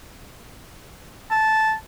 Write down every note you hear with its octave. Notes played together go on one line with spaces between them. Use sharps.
A5